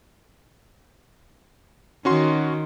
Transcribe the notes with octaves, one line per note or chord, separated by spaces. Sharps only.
D#3 C#4 F#4 C6